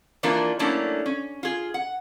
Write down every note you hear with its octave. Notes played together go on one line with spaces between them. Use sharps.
E3 F3 A#3 D4 F4 A#4
F#3 A3 A#3 C#4 D4 E4
C#4
F4 G#4
F#5